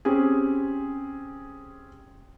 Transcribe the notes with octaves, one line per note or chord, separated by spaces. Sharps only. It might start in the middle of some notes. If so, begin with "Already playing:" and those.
C4 C#4 G4 G#4